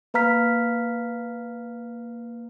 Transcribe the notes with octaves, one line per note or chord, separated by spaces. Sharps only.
A#3 B4 F5 A#5 F6 B6